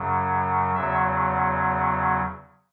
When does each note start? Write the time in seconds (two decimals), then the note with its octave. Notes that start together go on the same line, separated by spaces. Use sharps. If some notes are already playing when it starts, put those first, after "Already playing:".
Already playing: F#2 C#3 F#3
0.75 E2 C#3 F#3 E5